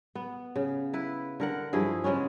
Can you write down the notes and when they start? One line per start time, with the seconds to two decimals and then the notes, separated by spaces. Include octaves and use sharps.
0.15 B3
0.56 C#3
0.93 E4 B4
1.40 D3 A#4 F#5
1.73 G2 F3 E4 G#4
2.04 C#3 G#3 B3 C#4